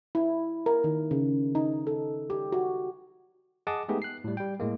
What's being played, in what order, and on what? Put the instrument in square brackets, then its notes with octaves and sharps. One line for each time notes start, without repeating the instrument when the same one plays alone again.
[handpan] E4
A#4
D#3
C#3
D#4
A4
G4
F#4
[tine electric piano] G#4 D#5 F#5 A5 D6 D#6
G#3 A3 B3 D#4 G4 G#4
F#6 C7
A2 G3
G3 G5
A2 G#3 A#3